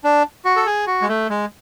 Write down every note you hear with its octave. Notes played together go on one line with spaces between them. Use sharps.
D4
F#4
A4
G#4
F#4
G#3
A3
G#3